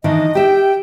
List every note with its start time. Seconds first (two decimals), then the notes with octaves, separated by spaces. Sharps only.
0.04 D#3 E3 D4 D#5
0.35 G4 E5 G5